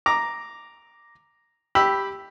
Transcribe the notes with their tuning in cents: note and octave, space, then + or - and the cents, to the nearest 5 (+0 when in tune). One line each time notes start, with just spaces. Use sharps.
A#5 +0 D6 +0
G4 +0 B5 +0 E6 +0